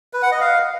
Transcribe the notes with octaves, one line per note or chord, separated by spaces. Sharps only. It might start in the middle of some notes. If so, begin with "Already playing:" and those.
B4
F#5
D#5
F5